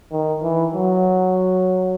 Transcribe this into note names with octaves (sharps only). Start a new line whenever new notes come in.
D#3
E3
F#3